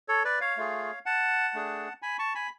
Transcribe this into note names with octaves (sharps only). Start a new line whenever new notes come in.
A4 C#5
B4 D5
C#5 F5
A3 F4 G#4
F#5 A5
A3 D4 G#4
G#5 B5
A5 C#6
G#5 B5